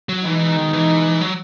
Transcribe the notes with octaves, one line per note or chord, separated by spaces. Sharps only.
F#3
B2 E3 G#3 D#4
D#3
E3
F#3